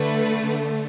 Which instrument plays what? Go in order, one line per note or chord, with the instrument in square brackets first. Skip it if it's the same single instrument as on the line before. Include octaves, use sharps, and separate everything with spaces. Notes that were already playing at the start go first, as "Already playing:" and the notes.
Already playing: [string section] D3 A3 B4